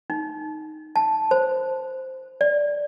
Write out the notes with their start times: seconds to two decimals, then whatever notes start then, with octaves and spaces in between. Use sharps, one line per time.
0.10 D#4
0.96 A5
1.31 C5
2.41 D5